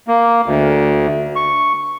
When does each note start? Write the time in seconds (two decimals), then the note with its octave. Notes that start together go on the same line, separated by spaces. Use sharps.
0.08 A#3
0.46 D2
1.36 C#6